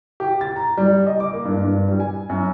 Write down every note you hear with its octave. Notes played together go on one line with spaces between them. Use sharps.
G4
A6
A#5
G3
D#5
D6
A#3
G2
G2
G3
G#5
F#2